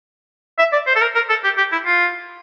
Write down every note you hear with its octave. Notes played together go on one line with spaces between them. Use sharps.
E5
D5
C5
A4
A#4
A#4
A4
G4
G4
E4
F4